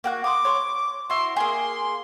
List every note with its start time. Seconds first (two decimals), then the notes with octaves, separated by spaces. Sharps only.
0.04 A#3 F#4 F#6
0.24 C6 D6 D#6
0.45 C#5 C6
1.10 E4 F#4 C6
1.37 A#3 G#4 C6